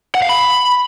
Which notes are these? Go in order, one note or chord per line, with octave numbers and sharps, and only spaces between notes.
F#5
F5
B5